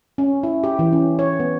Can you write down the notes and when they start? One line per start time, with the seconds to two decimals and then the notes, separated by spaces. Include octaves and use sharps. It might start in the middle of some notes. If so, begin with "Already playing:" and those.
0.18 C#4
0.43 E4
0.64 G4
0.79 E3
0.93 C#4
1.19 C#5
1.40 B3